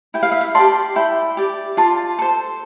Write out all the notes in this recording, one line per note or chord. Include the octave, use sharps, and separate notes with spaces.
E4 G5
F5
E5
F5
G4 D5 A5 C6
E4 G5 B5
G4 D5
F4 A5 C6
A4 C5